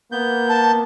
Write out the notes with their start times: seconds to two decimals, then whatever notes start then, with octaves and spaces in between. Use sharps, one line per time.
0.12 A#3 B3 G6
0.49 A5